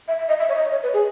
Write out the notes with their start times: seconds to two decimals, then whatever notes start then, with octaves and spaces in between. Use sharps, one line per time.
0.08 E5
0.19 E5
0.28 D#5
0.39 E5
0.49 C#5
0.55 D#5
0.71 C#5
0.83 B4
0.94 G#4